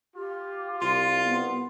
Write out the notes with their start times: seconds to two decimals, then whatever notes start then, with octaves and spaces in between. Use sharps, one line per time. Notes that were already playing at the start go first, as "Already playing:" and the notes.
0.15 F4 G4
0.81 C2 F4 C6
1.25 B3